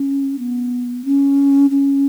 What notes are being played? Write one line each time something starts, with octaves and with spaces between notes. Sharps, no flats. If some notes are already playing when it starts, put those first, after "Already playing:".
Already playing: C#4
B3
C#4
C#4